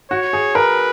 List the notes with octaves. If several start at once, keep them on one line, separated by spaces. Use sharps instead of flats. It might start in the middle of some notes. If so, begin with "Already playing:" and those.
F#4 C#5
G#4
A#4 B4